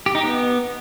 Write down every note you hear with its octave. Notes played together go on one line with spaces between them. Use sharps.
G4
D#4
B3